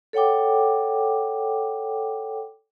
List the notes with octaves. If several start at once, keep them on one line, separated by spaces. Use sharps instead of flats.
A4 C#5 F#5 G5 D6